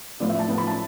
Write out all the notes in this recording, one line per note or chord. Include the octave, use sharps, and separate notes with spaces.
A2 F3 B3 D5
E5
A5
A2 F3 B3
B5
A5